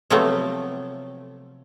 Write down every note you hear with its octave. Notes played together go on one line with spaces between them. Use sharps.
C3 F3 F#3 A3 B3